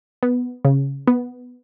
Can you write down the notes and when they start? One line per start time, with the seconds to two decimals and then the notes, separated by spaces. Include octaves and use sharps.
0.23 B3
0.65 C#3
1.07 B3